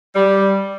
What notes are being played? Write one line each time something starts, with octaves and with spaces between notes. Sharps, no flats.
G3